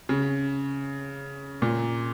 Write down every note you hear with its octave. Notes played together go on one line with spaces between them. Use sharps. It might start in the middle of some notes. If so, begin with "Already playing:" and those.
C#3
A#2